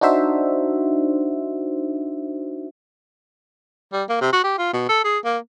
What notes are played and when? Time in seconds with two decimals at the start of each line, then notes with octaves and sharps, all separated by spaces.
0.01 D4 D#4 F#4 C5 E5
3.92 G3
4.09 A#3
4.21 C3
4.33 F#4
4.44 G4
4.58 F4
4.73 B2
4.89 A4
5.04 G#4
5.25 A#3